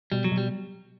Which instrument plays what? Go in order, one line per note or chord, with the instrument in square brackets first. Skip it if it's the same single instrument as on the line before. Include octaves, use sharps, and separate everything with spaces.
[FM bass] B2 [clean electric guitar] G3
[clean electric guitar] F#3
[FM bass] B2
[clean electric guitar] G3